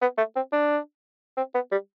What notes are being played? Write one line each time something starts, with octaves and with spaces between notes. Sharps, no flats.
B3
A3
C4
D4
C4
B3
G3